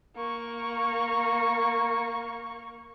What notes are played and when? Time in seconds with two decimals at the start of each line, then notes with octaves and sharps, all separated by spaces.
0.16 A#3 C#6